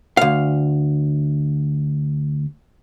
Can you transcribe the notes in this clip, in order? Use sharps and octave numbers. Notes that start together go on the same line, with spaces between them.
D2 F5